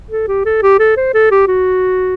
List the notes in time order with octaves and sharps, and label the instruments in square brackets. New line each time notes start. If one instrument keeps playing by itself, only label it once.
[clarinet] A4
G4
A4
G4
A4
C5
A4
G4
F#4